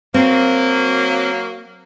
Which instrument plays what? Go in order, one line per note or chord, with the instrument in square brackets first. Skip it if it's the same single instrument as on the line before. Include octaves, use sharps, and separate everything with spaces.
[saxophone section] F#3 A#3 [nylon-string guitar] C4